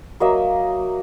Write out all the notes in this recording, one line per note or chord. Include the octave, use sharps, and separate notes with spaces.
F#3 A#3 D#5 E5